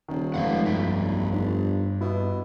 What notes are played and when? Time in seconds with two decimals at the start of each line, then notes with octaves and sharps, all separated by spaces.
0.08 D#1 D#3
0.34 F1 F3 G#3 F5 F#5
0.65 B1 G2 E5 G5
1.31 G1
2.01 B2 B3 E4